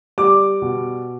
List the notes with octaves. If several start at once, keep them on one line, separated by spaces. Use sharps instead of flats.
G3 D6
B2